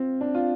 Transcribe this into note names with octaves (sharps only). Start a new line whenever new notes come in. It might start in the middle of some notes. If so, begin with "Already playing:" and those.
Already playing: C4 F4
D4
F4